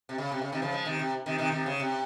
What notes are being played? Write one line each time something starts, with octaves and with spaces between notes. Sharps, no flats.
C3
C#3
C3
C#3
C3 D#3
C#3 F3
F3 G#3
C3 D#3
C3
C3 D#3
C3 D#3
C3 D#3
C#3
C3